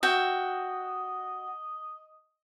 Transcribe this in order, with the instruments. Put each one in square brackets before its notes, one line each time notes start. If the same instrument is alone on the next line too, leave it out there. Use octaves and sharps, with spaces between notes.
[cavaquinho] F#4 E5 G5 [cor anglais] D#5